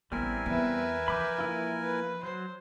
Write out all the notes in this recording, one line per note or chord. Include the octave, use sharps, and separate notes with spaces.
A1 G3 B3 C4 E4 A#4 G#5
E2 B3 B4 E5
E3 F3 B5 D6 G6
A#3 E4 F4
B4
F#3 C5